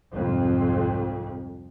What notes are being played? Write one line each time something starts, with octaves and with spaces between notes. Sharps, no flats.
C2 F2 G#2